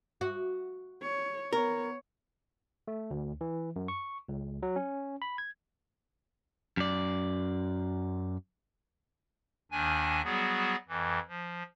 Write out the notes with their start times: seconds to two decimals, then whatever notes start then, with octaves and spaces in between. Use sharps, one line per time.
0.21 F#4
1.02 C#5
1.53 B3 A#4 C#5
2.88 A3
3.11 D2
3.41 E3
3.76 F#2
3.88 C#6
4.29 C#2
4.63 F#3
4.76 C#4
5.22 B5
5.38 G#6
6.77 F#2 D5
9.71 D#2 D#3 D4 G#5
10.24 F#3 G3 B3 F#4 G#4
10.89 F2 E3
11.28 F3